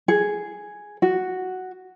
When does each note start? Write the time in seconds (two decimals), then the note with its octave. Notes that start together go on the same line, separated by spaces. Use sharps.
0.08 G#4
1.02 F#4